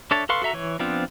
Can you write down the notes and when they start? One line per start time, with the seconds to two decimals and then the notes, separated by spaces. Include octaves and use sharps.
0.11 D4 A4 C#5 E5 A5
0.29 A4 B4 F5 C6 C#6
0.42 F#4 A4 E5 A#5
0.53 E3 C#5
0.79 F3 B3 C4 D4 F4